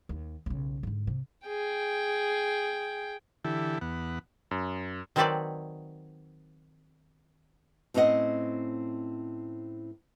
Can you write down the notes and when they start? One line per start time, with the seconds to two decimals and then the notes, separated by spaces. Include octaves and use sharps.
0.09 D#2
0.46 B1 C#3
0.83 G#2 D3
1.07 C3
1.47 G#4 G5
3.45 D3 E3 E4 G4 A4
3.81 E2 B3 F#5
4.51 F#2
5.16 D#3 F#3 C4 A4 B4 D5
7.94 A2 C4 C#4 C#5 D#5 F#5